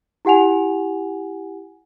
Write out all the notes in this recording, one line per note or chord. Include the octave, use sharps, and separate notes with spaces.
E4 G4 F#5 G#5 F7